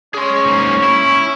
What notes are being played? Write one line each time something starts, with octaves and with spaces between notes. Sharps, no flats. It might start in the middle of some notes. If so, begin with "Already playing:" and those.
C#4 G#4 C6
G#2 A#3
E4